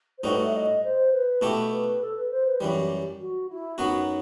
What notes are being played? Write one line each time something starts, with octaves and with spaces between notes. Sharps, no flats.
C5
A2 G3 D#4 F#4 B4
E5
D#5
C5
B4
B2 A3 E4 G4
B4
A4
B4
C5
B4
F#2 E3 G3 G4
F#4
E4
F#2 F#3 B3 D#4 F#4